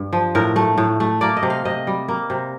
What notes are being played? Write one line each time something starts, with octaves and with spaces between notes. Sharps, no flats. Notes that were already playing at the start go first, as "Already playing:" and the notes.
Already playing: G2
F3
A2 A#4
A3
A2
A3
A#3 D5
D#5
C3
F5
C3 D#5
G3
A#3
C3